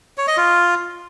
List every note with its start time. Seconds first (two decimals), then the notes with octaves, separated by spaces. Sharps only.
0.18 C#5
0.27 D#5
0.37 F4